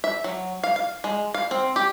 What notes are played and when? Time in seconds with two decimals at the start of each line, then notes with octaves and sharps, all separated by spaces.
0.04 E5
0.24 F#3
0.63 F5
0.76 F5
1.04 G#3
1.34 F5
1.51 C4
1.76 G4